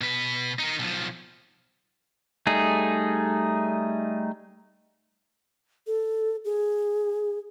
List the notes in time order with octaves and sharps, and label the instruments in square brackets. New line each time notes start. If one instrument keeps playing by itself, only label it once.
[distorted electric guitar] B2 B4
D#4 A#4
B1 F3
[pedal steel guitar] G3 A3 D#4 G#4
[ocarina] A4
G#4